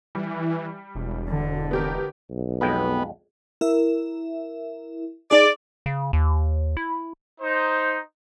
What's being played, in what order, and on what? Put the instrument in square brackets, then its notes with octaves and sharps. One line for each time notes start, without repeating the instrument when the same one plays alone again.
[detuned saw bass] E3 [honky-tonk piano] G3
[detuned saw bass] E1
[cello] D3
[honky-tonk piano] B3 G4 A#4
[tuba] B1
[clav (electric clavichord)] F2 G#3 G5 [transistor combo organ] B3
[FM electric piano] E4 A#4 E5
[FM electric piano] D#4 G#4 [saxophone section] D5
[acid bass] C#3
D#2
E4
[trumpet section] D#4 C5